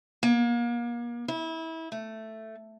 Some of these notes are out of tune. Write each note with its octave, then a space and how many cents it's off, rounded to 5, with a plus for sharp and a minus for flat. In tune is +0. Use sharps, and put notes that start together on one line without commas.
A#3 +35
E4 -25
A3 +5